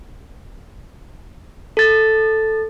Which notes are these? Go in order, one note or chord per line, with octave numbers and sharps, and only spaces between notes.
A4 A6